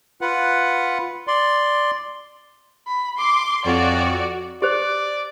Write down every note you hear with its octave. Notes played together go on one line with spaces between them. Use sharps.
F4 B4 F#5
D5 C6
B5
C6 D6
F2 F#4 C#5 D5
G4 C5 D5